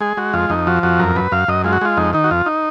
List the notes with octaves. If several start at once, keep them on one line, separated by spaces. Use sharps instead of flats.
G#3 G#4
G#3 F#4
F2 F4
F2 D#4
F3 F#4
F2 F#4
F#2 A#4
F#2 B4
F#2 F5
F#2 D#5
G#3 F4
F#4
G#3 F4
F2 D#4
D#3 D#4
F#4
F2 F4
D#4